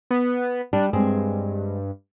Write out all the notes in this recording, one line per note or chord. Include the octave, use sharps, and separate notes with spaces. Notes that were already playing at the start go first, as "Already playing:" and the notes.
B3
G3 D4
G2 G#3 C4 G#4